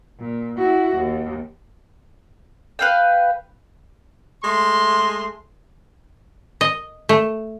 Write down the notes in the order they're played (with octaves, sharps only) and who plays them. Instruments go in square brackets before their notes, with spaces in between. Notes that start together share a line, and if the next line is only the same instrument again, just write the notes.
[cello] A#2
E4 F#4
D#2
[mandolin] B4 F5 G5
[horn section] G#3 A3 C6
[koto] D#5
A3